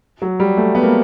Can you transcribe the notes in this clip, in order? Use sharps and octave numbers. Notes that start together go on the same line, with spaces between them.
F#3
G3
A3
B3
A#3